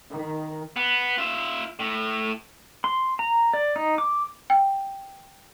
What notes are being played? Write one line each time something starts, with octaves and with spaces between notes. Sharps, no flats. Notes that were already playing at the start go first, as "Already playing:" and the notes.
D#3
B3
F4 E5
A2
C6
A#5
D5
D#4
D6
G5